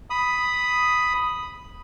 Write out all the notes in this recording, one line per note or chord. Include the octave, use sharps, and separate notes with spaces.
B5 D#6